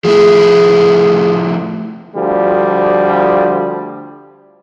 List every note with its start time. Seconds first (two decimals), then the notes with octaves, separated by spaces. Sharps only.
0.05 F3 A3 E4 G#4
2.15 D2 F3 G3